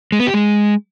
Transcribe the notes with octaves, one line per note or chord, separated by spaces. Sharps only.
G#3
B3
G4
G#3